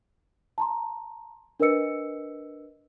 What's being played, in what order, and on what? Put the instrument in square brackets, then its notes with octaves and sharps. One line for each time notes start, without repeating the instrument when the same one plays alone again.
[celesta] A5 A#5 C6
D4 A#4 B4 D#5 E6 C#7